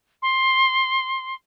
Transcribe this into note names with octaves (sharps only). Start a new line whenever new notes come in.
C6